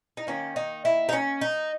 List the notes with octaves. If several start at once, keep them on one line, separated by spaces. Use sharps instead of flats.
D#4
D#3 A#3 C#4
D#4
E4
D#4
C#4
D#4